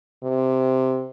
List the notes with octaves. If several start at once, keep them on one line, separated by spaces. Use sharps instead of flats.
C3